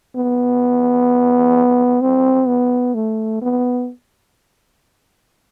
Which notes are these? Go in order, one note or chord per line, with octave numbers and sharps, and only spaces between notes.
B3
C4
B3
A3
B3